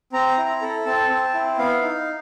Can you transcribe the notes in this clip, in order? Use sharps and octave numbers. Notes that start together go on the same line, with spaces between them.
C4 A#5
E4
A4
C4 A5
C4
E4
B3 F5
D#4